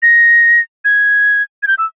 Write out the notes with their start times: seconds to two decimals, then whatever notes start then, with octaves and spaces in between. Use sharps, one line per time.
0.03 A#6
0.85 G#6
1.63 G#6
1.67 G6
1.78 E6